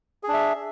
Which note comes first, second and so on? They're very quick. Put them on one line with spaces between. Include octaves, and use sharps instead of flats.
G#4 D4 E5